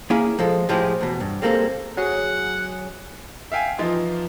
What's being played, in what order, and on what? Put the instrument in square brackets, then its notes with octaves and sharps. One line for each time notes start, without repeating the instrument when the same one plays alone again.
[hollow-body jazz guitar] A#3 C#4 E4 G#4 G#5
F3 G#3 A4
A2 F3 G#3 E4 G4 G#4
E2 B2
G2
G3 G#3 A#3 C4 F#4 A4
[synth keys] F#3 G#4 [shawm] F#5
[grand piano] E5 F5 G5 G#5
E3 F3 D#4 F4